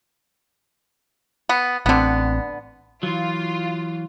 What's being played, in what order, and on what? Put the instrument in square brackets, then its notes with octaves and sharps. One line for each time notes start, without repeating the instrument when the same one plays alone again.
[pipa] B3
[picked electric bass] A1 C4 [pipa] D3 B3
[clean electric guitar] E3 F#3 [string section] F4